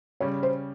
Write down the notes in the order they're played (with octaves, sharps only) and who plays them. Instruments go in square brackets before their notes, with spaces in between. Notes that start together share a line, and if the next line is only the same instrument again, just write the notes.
[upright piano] C#3 G3 C#4 [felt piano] C#5
[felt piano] C5